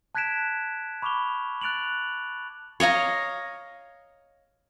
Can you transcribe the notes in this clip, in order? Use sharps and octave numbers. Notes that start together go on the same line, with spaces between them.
A5 F#6 G#6 B6 D7 E7
B5 C#6 D6 F6 F7 G7
F#6 A6 D7 F7 F#7
C#5 D#5 F5 A#5